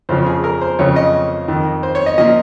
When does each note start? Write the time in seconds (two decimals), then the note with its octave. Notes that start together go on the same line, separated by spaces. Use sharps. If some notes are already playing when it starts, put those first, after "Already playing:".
0.09 F2 C#3 F3 C5
0.26 G#4
0.44 A#4
0.61 C5
0.79 F2 C#3 F3 C#5
0.96 D#5
1.48 F2 D#3
1.83 C5
1.95 C#5
2.06 D#5
2.18 A#2 F3 D#5